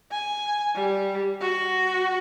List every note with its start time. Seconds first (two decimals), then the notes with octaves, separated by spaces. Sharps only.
0.11 G#5
0.75 G3
1.41 F#4